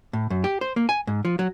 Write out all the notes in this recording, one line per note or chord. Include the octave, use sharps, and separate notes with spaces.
A2
F#2
G4
C5
A#3
G#5
G#2
F3
F#3